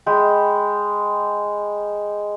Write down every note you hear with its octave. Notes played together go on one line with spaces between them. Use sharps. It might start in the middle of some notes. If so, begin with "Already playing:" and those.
G#3 G5 B5